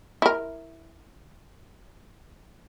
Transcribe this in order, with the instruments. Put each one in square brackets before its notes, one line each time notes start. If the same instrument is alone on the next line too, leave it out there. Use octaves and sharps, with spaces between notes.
[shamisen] E4 A#4